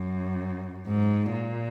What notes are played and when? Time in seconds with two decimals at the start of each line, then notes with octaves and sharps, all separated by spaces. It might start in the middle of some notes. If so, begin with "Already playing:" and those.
Already playing: F#2
0.88 G#2
1.32 A#2